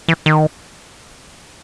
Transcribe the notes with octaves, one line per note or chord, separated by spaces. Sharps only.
E3
D#3